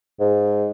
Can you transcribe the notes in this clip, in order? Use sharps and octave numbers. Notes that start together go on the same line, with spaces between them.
G#2